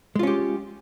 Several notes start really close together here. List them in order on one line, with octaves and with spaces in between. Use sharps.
G#3 F4 C#4 G4